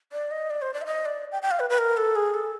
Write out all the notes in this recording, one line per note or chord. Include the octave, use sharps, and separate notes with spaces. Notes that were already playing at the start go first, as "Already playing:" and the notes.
D5
D#5
D5
C5
D5
E5
D#5
D5
G5
G5
F5
B4
B4
A#4
A4
G#4
A4